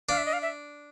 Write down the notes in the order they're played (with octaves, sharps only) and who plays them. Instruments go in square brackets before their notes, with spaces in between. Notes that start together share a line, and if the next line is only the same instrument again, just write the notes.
[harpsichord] D4 [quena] F5
[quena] E5
D#5
F5
E5